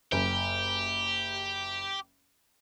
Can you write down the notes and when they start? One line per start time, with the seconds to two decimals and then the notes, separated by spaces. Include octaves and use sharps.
0.12 F#1 G4